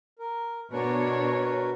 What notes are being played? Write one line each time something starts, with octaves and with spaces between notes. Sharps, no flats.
A#4
B2 D4 F#4 A#4 B4 C#5